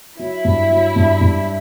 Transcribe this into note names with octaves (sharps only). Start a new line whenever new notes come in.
F#3 E4
G2
F#3
G2
G2